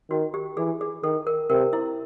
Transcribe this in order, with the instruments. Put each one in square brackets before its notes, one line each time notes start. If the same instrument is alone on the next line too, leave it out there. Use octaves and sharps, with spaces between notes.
[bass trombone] D#3 [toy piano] F#4
[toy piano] G4
[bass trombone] E3 [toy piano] G#4
[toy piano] G#4
[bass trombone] D#3 [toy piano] A4
[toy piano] A#4
[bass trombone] C3 [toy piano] A#4
[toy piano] E4